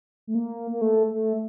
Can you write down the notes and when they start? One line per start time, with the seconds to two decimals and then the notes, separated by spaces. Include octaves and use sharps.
0.27 A3
0.35 A#3
0.72 A#3
0.81 A3
1.11 A3